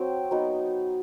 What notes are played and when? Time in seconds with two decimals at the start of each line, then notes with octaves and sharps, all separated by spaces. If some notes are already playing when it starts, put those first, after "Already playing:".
Already playing: F#3 C4 G5
0.31 F#3 B3 D#4